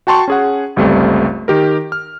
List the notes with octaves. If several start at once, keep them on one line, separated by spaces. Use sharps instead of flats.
F#4 G5 A5 C6 C#6
C#4 G#4 F#5
G1 C#2 G3 A3 C4
D#3 G4 A#4
F6